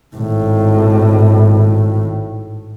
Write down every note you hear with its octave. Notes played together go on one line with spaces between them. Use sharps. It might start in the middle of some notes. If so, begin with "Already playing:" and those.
G#1 A2